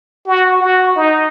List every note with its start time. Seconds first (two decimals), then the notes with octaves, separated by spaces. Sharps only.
0.27 F#4
0.61 F#4
0.96 D#4